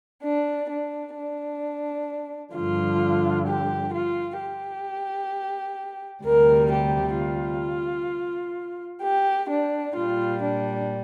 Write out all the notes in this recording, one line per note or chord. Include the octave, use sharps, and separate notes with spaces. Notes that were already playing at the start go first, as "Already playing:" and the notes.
D4
D4
D4
G2 D3 F3 F4
G4
F4
G4
D2 C3 G3 A#4
G4
F4
G4
D4
A#2 G3 F4
D4